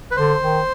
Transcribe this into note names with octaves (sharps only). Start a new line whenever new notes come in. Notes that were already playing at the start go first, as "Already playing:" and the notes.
B4
D3 C5
D#3